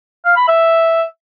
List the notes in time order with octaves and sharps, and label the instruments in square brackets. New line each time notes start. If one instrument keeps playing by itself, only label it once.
[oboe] F5
B5
E5